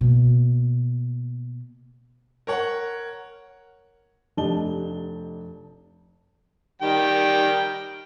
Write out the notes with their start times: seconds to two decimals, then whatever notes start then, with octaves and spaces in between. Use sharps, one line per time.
0.01 B2 A#3
2.47 A#4 C#5 F#5
4.37 F1 D4 G4 D#5 A5 G7
6.82 D#3 G3 G5